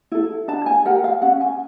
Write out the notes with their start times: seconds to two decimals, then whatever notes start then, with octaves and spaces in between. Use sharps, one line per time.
0.12 E4 A4
0.48 D4 A5
0.66 G#5
0.85 G4 A#4 F#5
1.04 F5
1.22 C#4 F#5
1.41 G#5